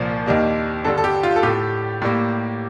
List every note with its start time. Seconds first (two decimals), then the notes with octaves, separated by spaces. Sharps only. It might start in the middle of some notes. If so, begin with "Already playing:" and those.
Already playing: C2 A#2 F3 A#3 C5
0.26 D#2 D#3 G3 A#3
0.85 G2 D3 G3 A4
0.98 A4
1.04 G4
1.23 F4
1.36 A4
1.43 A2 A3 G4
2.02 A2 G3 A#3